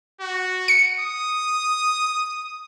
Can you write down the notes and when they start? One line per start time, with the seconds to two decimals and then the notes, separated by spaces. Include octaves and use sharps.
0.21 F#4
0.68 C#7
1.00 D#6